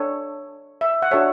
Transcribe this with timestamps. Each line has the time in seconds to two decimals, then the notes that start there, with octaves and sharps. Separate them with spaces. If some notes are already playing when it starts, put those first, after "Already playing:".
Already playing: D4 A4 C#5
0.81 E5
1.02 F#5
1.11 D4 F#4 A4 C#5 E5